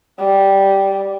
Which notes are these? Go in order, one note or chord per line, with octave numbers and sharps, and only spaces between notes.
G3